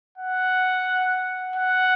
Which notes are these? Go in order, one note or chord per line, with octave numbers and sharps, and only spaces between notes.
F#5
F#5